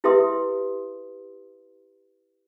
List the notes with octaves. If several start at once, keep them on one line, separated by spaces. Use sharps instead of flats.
E4 G4 B4 E5 C6 D#6